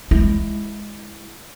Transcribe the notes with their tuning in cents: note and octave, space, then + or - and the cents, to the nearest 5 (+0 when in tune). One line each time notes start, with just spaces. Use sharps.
G#3 +0 E4 +0